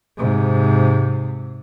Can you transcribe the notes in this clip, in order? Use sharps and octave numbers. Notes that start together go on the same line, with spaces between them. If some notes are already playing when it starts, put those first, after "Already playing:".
G#2 C3